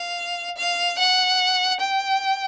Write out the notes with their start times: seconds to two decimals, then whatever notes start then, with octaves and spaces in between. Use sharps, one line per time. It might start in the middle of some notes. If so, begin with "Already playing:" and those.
Already playing: F5
0.58 F5
0.98 F#5
1.80 G5